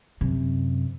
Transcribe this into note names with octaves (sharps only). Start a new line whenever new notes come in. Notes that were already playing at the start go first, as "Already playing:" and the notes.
F#2 C3